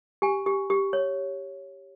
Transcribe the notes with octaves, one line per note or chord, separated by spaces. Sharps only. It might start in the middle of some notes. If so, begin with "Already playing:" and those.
G4 G#5
G4
G4
C#5